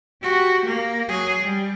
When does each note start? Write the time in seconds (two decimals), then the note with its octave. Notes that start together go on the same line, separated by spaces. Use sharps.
0.22 F#4 G4
0.66 A#3
1.09 F#3 G#4
1.42 G3